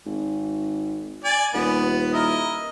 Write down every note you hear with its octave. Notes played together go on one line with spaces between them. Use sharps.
G#1
D5 G#5
D#1 B3
E4 A#4 D#5